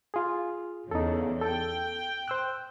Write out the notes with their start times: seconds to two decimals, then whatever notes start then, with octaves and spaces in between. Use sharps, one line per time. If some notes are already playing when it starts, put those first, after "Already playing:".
0.14 F4 G#4
0.91 E2 C#3 D#4 A4
1.41 A4 G5
2.28 C5 E6 F#6